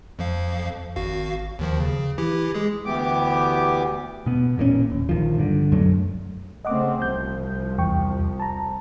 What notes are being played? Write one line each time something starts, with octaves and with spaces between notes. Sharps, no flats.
F2 F3 F5
G#1 F#4 F5
D#2 D#3 F3
C#3
E3 E4 G4
G#3 G#4
D2 E3 B3 G4 D6
B2 B3
A1 A#2 D3 C#4
D#1
A#1 D#3 F3
G2 D3
B1 F#2 F#3 A3
C#3 A3 C4 D#5 F#5 D6
C2 F3 G6
E2 G5 C#6
A5 A#5